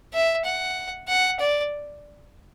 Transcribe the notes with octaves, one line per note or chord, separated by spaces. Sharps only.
E5
F#5
F#5
D5